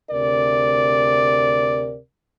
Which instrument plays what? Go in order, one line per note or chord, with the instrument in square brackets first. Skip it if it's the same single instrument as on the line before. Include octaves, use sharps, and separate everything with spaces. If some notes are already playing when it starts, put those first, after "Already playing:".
[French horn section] D2 C3 A#4 D5